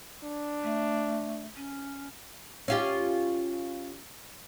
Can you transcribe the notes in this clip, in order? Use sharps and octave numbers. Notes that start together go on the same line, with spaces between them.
D4
A3
C#4
C#4 F4 G4